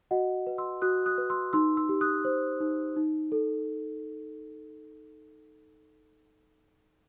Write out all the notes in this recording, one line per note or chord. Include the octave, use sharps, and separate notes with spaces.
F#4 D#5 F#5
B4
C6 E6
F#4 D#6 F#6
D#6 F#6
B4
C6 E6
D#4 C6 E6
C6 E6
G4
D#6 F#6
C5
D#4
D#4
A4